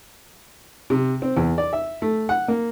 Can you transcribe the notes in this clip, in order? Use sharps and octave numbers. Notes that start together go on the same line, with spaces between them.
C3
C4
E2
D5
E5
A3
F#5
A#3